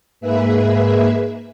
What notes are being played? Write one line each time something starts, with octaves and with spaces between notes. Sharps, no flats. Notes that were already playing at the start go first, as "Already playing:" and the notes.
G#2 A#3 G#4 B4 E5